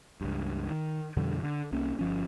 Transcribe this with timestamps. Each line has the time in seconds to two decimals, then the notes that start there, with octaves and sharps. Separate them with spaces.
0.21 C#2 G2
0.70 D#3
1.17 F2 B2 D3 G3
1.43 D3
1.72 C2 C3 A#3 C#4
1.99 G1 F3 C#4